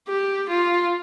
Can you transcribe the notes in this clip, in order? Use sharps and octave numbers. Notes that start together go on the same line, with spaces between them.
G4
F4